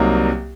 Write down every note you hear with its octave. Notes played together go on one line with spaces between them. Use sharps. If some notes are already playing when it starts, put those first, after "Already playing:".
Already playing: C2 C3 F#3 A#3 D#4